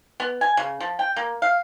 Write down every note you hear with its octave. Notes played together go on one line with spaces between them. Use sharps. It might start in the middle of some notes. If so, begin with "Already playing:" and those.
B3
G#5
C#3
F3
G5
A#3
F5